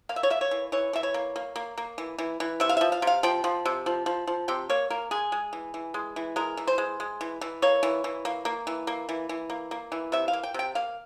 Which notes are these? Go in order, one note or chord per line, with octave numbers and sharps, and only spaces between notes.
A#3 F5
E5
C#5
A#3 E5
C#5
E3
E3 C#5
E3 E5
C#5
A#3
A#3
A#3
A#3
E3
E3
E3
C3 E5
F5
F3 E5
F5
C3
F5
F3 G5
F3
C3
F3
F3
F3
C3 G5
A#3 C#5
A#3 A#4
G#3 G#4
G#3
E3
E3
G#3
E3
G#3 A#4
E3
C5
G#3
G#3
E3
E3
A#3 C#5
E3
E3
A#3
A#3
E3
A#3
E3
E3
A#3
A#3
E3
C3 E5
F5
A#3
G5
C3 G5
A#3 F5